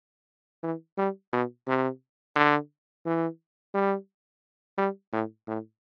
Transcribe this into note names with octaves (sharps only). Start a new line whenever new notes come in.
E3
G3
B2
C3
D3
E3
G3
G3
A2
A2